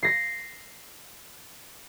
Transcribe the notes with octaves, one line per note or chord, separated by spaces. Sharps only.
A#6 C7